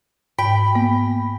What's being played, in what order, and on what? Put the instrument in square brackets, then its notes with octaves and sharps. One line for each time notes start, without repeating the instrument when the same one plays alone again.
[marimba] G#2 [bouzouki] G5 [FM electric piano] B5
[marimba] A#3 B3